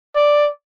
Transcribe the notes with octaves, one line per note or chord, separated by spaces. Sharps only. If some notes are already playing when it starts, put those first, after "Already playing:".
D5